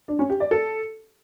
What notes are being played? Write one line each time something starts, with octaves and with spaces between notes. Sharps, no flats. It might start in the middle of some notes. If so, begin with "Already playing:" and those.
D4
C#4
G4
D5
A4